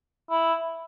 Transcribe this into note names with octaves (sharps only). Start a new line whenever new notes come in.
E4